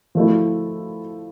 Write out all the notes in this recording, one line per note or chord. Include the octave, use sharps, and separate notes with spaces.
F3 A3 E4